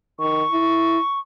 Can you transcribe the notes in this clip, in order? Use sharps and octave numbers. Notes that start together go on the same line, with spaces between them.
D#3 C#6
E4